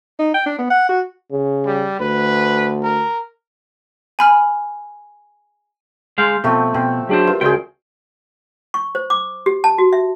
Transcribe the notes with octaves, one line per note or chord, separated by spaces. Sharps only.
D#4
G5
D4
B3
F#5
F#4
C#3
G3
D2 B4
A#4
G#5 B5 F6
G#3 F5 C6 G6
B2 F3 A3 C4
B2 C4
F#3 D4 F#4 G#4 C5 G5
F4 G4 A#4 B4
C#2 F#4 G#4 A#4 C5 D5 G5
C#6
C5
D6
G4
A5
F#4
E5